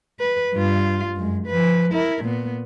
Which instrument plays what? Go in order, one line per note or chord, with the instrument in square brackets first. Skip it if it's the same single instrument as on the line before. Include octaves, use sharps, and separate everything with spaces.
[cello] B4
G2 F4
F#2 G#3
F3 B4
E4 A#4
A#2 B3